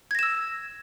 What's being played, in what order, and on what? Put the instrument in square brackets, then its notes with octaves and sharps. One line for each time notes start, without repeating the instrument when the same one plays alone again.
[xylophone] G#6
A#6
E7
E6